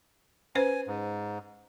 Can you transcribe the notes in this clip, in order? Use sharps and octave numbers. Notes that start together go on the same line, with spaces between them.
C#4 B4 C5 G#5
G#2